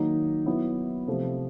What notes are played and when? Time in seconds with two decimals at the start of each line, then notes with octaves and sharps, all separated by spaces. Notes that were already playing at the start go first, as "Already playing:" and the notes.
Already playing: D#3 F#3 A#3 D#4
0.46 F#3 B3 E4
1.07 C3 F3 A3